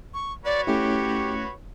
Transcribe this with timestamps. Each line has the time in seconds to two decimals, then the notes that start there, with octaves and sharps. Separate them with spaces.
0.14 C#6
0.45 F#4 B4 C#5 D5
0.67 A3 C#4 E4 G4